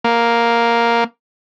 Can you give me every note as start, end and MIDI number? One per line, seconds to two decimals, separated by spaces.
0.04 1.04 58